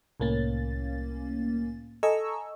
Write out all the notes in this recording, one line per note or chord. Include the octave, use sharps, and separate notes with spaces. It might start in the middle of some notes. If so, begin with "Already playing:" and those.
C2 A2 A#3 C#4 A6
A4 D#5 G#5 A#5 C#6 E6